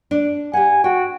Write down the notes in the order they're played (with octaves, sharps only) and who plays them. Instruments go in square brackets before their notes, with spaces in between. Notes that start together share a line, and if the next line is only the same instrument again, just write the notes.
[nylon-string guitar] D4
[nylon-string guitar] G4 F#5 [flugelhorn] G#5
[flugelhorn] F#4 [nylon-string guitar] G5